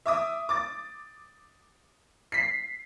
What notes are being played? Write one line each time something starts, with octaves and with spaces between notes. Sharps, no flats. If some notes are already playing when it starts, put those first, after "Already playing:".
E5 D6 D#6
D6 A6
B6 C7